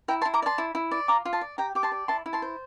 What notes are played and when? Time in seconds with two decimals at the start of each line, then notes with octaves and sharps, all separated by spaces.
0.08 E4 G5 A#5
0.22 A5 C6
0.25 E4
0.34 A#5 D6
0.42 D5 A5 C6
0.58 E4
0.75 E4
0.91 D5
1.08 F4 A#5 D6
1.25 F4
1.33 A5 C6
1.41 D5
1.58 G4 G5 A#5
1.75 G4 D6
1.83 A5 C6
1.92 D5
2.08 E4 A5 C6
2.26 E4
2.33 A5 C6
2.42 C5